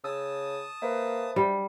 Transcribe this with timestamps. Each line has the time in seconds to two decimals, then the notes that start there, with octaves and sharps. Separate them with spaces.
0.04 C#3 A5 D#6 E6
0.82 A#3 B4 C5 E5
1.36 G3